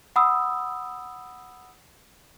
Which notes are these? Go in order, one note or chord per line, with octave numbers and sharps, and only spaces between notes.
F#5 B5 D#6 E6